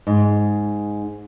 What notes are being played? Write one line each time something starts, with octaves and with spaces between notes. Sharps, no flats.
G#2